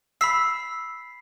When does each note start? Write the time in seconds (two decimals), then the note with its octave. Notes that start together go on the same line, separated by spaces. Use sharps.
0.21 B5 E6 B6 C7